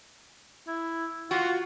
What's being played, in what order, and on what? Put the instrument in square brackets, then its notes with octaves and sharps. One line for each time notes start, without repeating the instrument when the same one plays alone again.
[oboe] E4
[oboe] F4 [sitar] F#4